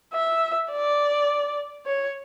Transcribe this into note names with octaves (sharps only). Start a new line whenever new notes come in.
E5
D5
C#5